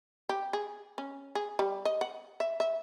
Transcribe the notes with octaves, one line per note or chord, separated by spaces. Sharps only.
G4
G#4
C#4
G#4
G3
D#5
F#5
E5
E5